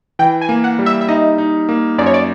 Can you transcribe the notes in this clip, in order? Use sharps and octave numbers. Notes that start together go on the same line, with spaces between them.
E3 G5
G#5
A#3
F#5
G3
E5
E5
D#4 D#5
D#4
A#3
F#2 D5
C#5
D5